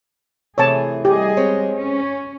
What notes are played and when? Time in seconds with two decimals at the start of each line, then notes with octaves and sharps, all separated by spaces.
0.58 C3 E3 A3 G#4 C#5 A5
1.05 G3 G4 G#4 D#5
1.37 G#3 C4 C#5
1.74 C#4